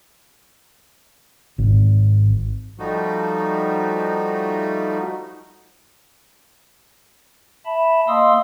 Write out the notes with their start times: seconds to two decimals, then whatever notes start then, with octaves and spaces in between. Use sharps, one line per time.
1.58 G#1
2.79 F3 G3 A3 D#4 F#4
7.66 E5 A5 B5
8.08 A#3 D#5 F5 C6 D#6 E6